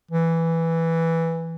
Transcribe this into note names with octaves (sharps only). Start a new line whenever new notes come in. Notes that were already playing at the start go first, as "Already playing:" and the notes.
E3